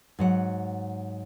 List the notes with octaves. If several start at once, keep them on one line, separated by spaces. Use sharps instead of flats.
G#2 F#3 F#5